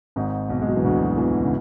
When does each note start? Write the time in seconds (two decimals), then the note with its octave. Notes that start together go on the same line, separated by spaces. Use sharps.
0.16 G#1 G#2
0.49 B1 B2
0.61 G#3
0.68 F#3
0.76 E3
0.84 D2 D3
1.17 E2 E3
1.43 C#3